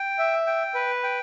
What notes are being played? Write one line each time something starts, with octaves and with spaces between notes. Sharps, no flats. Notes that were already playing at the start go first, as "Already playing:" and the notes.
Already playing: G5
E5
G5
B4
G5